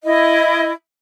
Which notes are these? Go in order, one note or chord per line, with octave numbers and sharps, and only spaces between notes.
E4 D#5